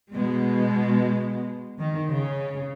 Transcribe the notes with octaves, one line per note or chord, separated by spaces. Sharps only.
B2 G#3
D#3
C#3